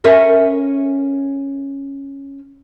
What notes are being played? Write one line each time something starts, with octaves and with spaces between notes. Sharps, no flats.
C#4 A#4 E5